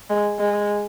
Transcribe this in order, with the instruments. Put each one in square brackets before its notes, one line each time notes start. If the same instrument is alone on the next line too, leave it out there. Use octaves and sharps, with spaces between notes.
[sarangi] G#3
G#3